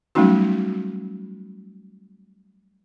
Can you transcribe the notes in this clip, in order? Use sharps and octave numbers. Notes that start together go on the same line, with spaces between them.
F#3 G3 A3 C#4 D#4 F#4